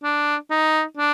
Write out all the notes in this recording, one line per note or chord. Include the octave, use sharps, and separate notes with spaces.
D4
D#4
D4